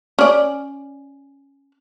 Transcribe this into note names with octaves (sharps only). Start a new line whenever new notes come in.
C#4 D5